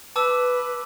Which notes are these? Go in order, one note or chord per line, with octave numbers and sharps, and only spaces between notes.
B4 A5 D6 E6